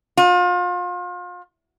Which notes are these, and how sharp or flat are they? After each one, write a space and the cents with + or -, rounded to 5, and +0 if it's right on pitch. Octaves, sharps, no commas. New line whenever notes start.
F4 +35